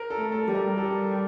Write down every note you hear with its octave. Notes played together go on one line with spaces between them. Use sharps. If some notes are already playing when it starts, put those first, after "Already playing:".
Already playing: A#4
A4
A3
A4
G3
A#4
G3 A4